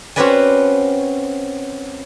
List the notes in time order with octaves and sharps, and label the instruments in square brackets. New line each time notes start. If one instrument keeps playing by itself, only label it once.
[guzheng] C4 C#4 F#4 B4 D5 G#5